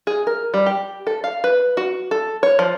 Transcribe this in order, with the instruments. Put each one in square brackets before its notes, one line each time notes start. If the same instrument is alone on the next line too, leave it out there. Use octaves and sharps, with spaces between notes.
[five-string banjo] G#4
A#4
G3
G4
A4
F5
B4
F#4
A4
C#5
F3